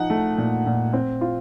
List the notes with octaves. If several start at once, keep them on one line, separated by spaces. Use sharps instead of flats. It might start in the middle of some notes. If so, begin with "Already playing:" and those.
Already playing: F3 D#4 F#5
A3
A#2
A#2
C4
F4